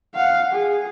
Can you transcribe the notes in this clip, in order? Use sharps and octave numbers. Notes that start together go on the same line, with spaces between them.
F5 F#5
G#4